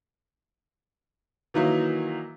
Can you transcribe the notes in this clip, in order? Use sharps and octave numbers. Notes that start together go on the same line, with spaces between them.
D#3 E3 F#3 A#3 D#4 E4